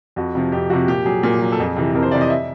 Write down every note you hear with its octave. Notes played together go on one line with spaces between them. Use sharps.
F2 F#4
C3 F3
F2 G4
C3 F3 F#4
A#2 G4
F#3 G#4
A#2
F#3
A4
F2 G#4
C3 E3
F2 A#4
C5
C3 E3 D5
D#5
E5